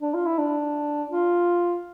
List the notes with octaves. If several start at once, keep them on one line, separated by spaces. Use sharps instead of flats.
D4
F4
E4
D4
F4